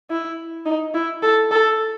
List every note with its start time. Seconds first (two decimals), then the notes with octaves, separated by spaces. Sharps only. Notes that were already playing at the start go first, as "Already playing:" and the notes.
0.10 E4
0.66 D#4
0.94 E4
1.22 A4
1.51 A4